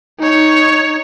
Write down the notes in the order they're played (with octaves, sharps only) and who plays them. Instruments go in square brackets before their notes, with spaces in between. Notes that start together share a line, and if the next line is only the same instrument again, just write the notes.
[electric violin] D#4 C#5